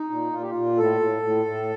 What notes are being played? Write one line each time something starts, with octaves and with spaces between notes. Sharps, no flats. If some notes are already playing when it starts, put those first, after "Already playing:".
Already playing: D#4
A#2
A#2 F4
G4
A#2 F4
A2 A4
A2
A2
A2